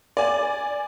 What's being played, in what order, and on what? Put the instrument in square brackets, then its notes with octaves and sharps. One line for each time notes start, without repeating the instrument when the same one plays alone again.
[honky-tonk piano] D5 G#5